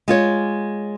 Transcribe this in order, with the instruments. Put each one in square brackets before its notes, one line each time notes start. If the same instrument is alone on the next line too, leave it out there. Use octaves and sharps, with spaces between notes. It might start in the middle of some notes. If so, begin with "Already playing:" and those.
[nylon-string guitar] G#3 F4 C#5